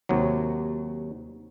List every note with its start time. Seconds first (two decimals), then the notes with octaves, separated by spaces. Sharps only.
0.09 D#2 C3 F#3